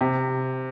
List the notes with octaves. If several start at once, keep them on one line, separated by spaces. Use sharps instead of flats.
C3